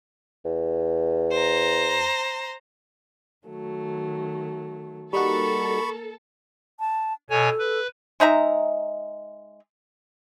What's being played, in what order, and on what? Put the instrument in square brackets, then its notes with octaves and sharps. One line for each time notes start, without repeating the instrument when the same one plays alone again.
[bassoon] E2
[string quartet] C5 A#5
D#3 F#3 A3
[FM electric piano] G3 D#4 F#4 [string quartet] A#3 A#4 [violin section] A4 [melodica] B5 C#6
[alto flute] A5
[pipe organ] B2 C#5 G#5 [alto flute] A4
[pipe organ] B4
[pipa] G#3 D#4 E5 A#5